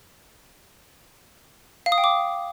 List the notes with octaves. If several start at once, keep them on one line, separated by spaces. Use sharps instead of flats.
F5
D#6
G5
D6